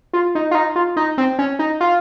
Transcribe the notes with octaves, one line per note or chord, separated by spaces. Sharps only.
F4
D#4
F4
D#4
F4
D#4
C4
C#4
D#4
F4